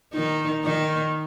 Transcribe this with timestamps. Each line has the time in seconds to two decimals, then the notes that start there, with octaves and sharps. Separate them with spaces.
0.14 D#3 D#4
0.64 D#3 D#4